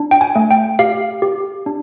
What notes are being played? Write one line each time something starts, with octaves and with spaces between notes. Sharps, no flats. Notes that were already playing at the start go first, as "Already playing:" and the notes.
Already playing: D4
G5
G#5
A3
G5
G4 F5
G4
D4